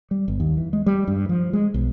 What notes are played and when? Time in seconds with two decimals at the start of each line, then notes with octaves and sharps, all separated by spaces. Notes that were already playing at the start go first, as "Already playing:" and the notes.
0.11 G3
0.28 G1
0.40 D#2
0.57 E3
0.73 G#3
0.86 G3
1.08 G2
1.29 F3
1.53 G#3
1.74 B1